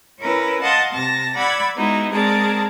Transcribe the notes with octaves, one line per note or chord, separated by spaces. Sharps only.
C#4 E4 A#4 B4
D#5 F5 F#5 A5 C6 D#6
C3 A5 A#6
D5 F#5 B5 E6 F#6 G#6
G#3 B3 D#4 E4 F#4
G#3 C4 G#4 A#4 D5 A5